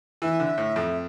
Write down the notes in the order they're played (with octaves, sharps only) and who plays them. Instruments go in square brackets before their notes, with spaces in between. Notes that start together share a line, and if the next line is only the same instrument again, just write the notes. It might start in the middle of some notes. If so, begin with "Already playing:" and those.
[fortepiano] E3 [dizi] E5
[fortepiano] D3
A2
F2